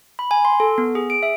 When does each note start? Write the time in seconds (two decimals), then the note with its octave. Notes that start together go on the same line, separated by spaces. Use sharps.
0.19 B5
0.31 G#5
0.45 C6
0.60 A4
0.78 B3
0.95 G#4
1.10 D7
1.23 E5